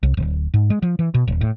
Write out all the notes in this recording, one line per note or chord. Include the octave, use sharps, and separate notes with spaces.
C2
D1
G#2
G#3
F3
E3
B2
D#1
A2